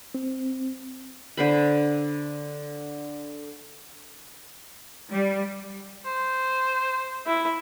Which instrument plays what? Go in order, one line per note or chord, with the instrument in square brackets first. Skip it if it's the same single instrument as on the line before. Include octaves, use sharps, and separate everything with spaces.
[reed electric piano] C4
[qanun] D3 C5 B5
[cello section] G3
[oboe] C5
[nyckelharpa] E4